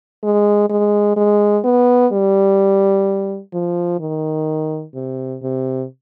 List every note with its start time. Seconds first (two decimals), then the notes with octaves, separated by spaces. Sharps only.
0.23 G#3
0.69 G#3
1.16 G#3
1.64 B3
2.12 G3
3.53 F3
4.00 D#3
4.94 C3
5.42 C3